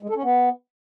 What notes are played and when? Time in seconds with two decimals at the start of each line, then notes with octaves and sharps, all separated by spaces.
0.03 G#3
0.09 A4
0.16 C#4
0.23 B3